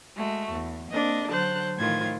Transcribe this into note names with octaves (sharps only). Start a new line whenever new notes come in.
G#3 A3 F#4
E2
A#3 C4 D4 D#5
D3 F#3 C5 A5 F#6
A2 D#3 E3 F4 C5 G#6